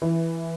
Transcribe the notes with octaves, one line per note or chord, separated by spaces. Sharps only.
E3